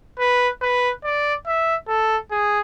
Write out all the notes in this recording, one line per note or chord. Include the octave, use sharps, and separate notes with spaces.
B4
B4
D5
E5
A4
G#4